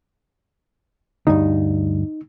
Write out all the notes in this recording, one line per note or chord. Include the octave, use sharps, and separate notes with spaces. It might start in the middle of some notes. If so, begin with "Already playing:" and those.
D2 G2 D#4